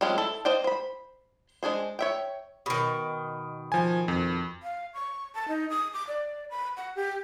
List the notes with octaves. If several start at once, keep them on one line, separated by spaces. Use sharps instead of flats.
F3 G3 G#3 C4 C#4
E4 A4 A5
C5 D5 D#5 F5 G5
C5 B5
G#3 D4 G#4 C5
C#5 E5 G5
B2 D#3
F3 G#5
F2
F5
C#6
A5
D#4
D#6
D6
D5
B5
F#5
G4